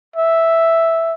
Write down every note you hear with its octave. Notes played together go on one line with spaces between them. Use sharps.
E5